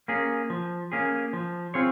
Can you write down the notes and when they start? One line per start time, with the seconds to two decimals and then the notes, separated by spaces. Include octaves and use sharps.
0.08 A#3 C#4 G#4
0.50 F3
0.92 A#3 C#4 G#4
1.33 F3
1.74 C4 F4 G#4 C#5